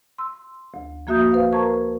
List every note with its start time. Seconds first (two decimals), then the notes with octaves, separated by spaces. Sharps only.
0.18 C6 E6
0.74 D2
1.07 F3 A#3 F#4 E5 D#6 G6
1.32 B4 C5 F5
1.53 A#4 C5 A5 A#5 C#6 G#6